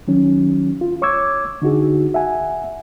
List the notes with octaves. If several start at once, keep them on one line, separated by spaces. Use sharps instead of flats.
D#3 F#3 C#4
F4
C#5 C#6 D6 E6 G#6
D3 D#4 F#4 G#4
E5 F#5 G#5